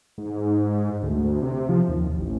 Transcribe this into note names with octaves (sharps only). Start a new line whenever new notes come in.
G#2
D2
C3
F3
D#2
A1